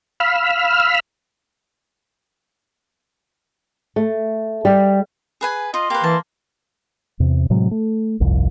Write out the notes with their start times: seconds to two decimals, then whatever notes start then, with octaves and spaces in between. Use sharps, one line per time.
0.20 F5 B5 E6 F6
3.96 A3
4.65 G3
5.41 G#4 B4 G#5
5.74 F4 D#5 C6
5.90 A#3 G4 B4
6.03 E3 A5
7.20 E2 C3
7.50 A2 C3 F#3 G#3
7.71 A3
8.20 G1 C2 F2